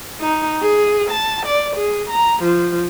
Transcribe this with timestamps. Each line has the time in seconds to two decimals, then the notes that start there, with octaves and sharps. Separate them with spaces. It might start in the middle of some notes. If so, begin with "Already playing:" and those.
0.21 D#4
0.62 G#4
1.11 A5
1.46 D5
1.77 G#4
2.10 A#5
2.43 F3